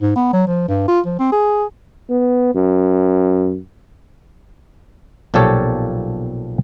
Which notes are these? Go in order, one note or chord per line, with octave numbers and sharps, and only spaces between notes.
G#2
B3
F#3
F3
G2
F4
F3
C4
G#4
B3
F#2
B1 A#2 F3 G4 A4 C#5